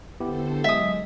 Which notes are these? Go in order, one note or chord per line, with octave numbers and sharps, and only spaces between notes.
D3 B3 E4 G4 A4 C5
F#3 G#3 E5 D#6